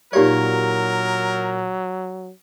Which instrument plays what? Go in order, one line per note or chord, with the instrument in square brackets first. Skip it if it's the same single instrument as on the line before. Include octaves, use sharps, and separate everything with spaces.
[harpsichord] A#2 C#5 [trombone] F#3 [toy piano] D#4 G4 D5 [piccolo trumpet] A#4